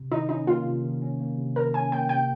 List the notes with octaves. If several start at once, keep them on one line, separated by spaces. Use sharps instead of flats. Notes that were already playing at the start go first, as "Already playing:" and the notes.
Already playing: C3
D#3 D#4
C#4 D#4
A#3 F4
C3
D#3
C#4
A#3
C3
D#3 A#4
C#4 G#5
A#3 G5
C3 G5